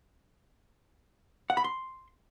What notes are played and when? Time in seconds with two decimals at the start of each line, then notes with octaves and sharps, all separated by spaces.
1.50 F#5
1.57 B5
1.64 C6